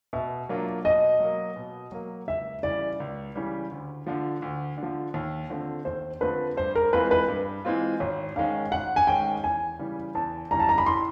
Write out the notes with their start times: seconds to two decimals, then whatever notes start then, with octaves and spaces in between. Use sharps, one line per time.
0.13 B2 E5
0.49 F#3 A#3 D4 F4
0.85 B2 D#5
1.20 F#3 A#3
1.56 B2
1.92 F#3 A#3
2.28 C#2 E5
2.63 C#3 E3 G3 D5
3.00 C#2
3.35 C#3 E3 G3
3.71 D2
4.07 D3 F3
4.42 D2
4.78 D3
4.83 F3
5.14 D#2
5.50 D3 F3 A3 C4
5.85 D#2 C5
6.21 D3 F3 A3 C4 B4
6.57 G2 C5
6.75 A#4
6.93 E3 G#3 C4 F4 B4
7.11 B4
7.28 G2
7.65 E3 G#3 C4 F4
8.00 G#1 C#5
8.36 G#2 D#3 G#3 C#4 F5
8.72 G#1 F#5
8.96 G#5
9.07 G#2 D#3 G#3 C#4 G5
9.43 E2 G#5
9.79 C#3 E3 G3
10.15 E2 A5
10.51 C#3 E3 G3 A#5
10.60 A5
10.69 A#5
10.78 B5
10.86 A2 C6